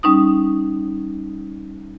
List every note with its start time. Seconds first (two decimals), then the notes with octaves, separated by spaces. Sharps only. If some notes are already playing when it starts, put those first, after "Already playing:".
0.03 G3 C#4 D#4 D#6